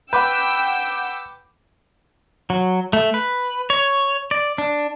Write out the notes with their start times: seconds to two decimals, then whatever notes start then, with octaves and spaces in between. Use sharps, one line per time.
0.13 B4 F#5 G5 D6 E6 G6
2.50 F#3
2.93 A3
3.14 B4
3.70 C#5
4.31 D5
4.58 D4